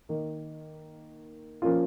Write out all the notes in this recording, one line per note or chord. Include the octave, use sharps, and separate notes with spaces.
D#3 A#3 D#4
F3 A#3 C#4 F4